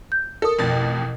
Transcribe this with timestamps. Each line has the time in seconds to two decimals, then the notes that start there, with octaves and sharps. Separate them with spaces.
0.12 G6
0.42 A4 A#4 D#6
0.59 A1 F2 B2 A6